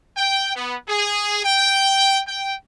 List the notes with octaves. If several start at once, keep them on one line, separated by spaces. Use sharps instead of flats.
G5
B3
G#4
G5
G5